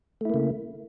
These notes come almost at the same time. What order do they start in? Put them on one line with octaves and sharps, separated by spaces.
A3 E4 A#3 C#3